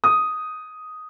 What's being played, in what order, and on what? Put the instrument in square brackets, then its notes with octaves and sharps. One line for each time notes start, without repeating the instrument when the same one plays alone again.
[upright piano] D#6